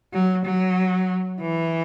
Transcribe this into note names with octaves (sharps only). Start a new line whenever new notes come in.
F#3
F#3
E3